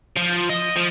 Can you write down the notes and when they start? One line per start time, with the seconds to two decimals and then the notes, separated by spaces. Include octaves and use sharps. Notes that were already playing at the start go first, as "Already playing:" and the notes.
0.17 F3
0.50 D#5
0.76 F3